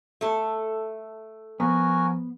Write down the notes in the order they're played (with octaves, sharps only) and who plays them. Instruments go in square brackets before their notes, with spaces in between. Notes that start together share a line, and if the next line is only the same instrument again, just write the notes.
[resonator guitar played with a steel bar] A3 A4
[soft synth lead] F3 [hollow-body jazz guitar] B3 [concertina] F#4 A#4 G#5